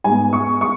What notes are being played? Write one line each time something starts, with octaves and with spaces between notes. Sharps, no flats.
G#2 G#3 B3 G#5
C#6
C#6